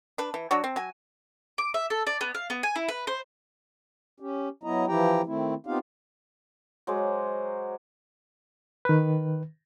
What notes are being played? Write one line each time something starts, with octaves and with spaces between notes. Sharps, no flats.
D4 B4
E3
F#3 D4 F#4 C#5
C4
F#3 G#5
D6
E5
A4
D5
B3
F5
B3
G#5
E4
B4
C5
C#4 G4
F#3 B3 E4 D#5 A#5
E3 F3 E4 G4 G5 A#5
D#3 A3 C4 E4
B3 C4 D#4 F4 G4 F5
F#3 G#3 C5 D6
D#3 B4